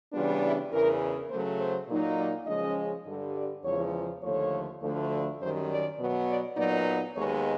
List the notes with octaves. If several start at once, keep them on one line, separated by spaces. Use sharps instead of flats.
C#3 E3 G3 B3 D4 F4
E4
E2 C#3 E3 A#4
C#3 F#3 A3 C5
C5
A#2 F#3 A#3 D#4
D5
C#3 F3 G#3 C#4 D#5
G2 D3 G3
D5
E2 C#3 F3 G#3 C#5
D#2 D3 F3 A3 C#5
D2 D3 F3 A3
F#2 D#3 G3 C5
D5
B2 F#3 B3
D5
A#2 F#3 B3 D#4 D5
D#2 D#3 G#3 B3 C#5